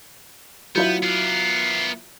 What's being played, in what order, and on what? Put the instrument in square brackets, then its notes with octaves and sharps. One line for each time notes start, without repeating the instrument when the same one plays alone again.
[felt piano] F#3 E4 F4 [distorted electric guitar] B3 [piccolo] G6
[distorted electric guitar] B3 A#4 [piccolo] C7